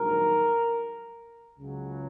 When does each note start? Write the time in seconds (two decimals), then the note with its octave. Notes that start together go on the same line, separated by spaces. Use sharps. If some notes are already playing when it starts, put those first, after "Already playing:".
Already playing: A#1 G#2 D#3 F#3 A#4
1.57 C#2 C#3 F#3